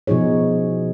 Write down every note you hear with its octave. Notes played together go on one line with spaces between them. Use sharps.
B2 F3 D#4 G#4 C#5